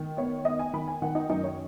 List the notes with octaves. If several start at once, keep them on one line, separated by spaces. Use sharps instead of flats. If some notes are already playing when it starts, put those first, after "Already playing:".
Already playing: D#3
B3 C#5
B3 D#5
G#5
D#3 B5
G#5
D#3 F#5
D#4
F#2 D#4
C#5